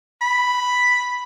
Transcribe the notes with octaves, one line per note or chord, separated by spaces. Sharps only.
B5